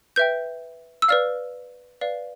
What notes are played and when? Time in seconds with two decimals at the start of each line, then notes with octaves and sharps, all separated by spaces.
0.16 B4 E5 G5 G6
1.02 E6
1.08 B4 D5 F5 F6
2.01 B4 D5 F5